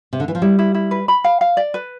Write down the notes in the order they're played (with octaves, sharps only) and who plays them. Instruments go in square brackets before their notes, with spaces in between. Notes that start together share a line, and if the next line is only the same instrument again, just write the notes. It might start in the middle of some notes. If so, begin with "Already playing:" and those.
[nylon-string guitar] C3
D3
E3
F3
[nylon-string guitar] G3 [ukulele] E4
[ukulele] E4
E4
B4
B5
F5
F5
D5
B4